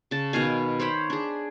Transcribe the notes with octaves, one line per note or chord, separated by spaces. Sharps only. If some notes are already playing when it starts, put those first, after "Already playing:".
C#3 A5
B2 D#3 F5 G#5
C5 C#5 G5 B5
D4 G#4